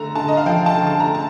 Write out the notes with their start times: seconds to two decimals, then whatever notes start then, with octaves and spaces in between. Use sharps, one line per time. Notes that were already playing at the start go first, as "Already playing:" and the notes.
Already playing: D3 A3 A#5
0.15 D3 A5
0.28 D#5
0.37 F5
0.46 F3 G5
0.66 A5
0.76 D3
0.87 A5
1.00 A#5
1.07 A3
1.15 A5